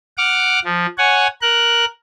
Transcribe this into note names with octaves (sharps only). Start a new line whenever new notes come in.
F#5 D6 F6
F3
C#5 F#5 G#5
A#4 F#6